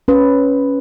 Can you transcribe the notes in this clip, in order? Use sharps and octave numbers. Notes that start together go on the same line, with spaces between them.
C#4 B4